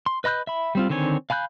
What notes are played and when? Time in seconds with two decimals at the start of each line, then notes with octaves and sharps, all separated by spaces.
0.06 C6
0.24 B4 D#5 B5 F#6 G6
0.47 E5 B5
0.75 G3 C4 F4
0.90 D3 D#3 C4 C#5 G#5
1.30 F5 G#5 B5 F#6 G6